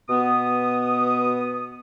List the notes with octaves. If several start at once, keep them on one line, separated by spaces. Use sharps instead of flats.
B2 B3 D#6